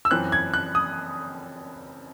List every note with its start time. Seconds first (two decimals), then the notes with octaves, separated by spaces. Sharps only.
0.05 E6
0.11 F#2 E3 C4 F#6
0.32 G#6
0.54 F#6
0.75 D#6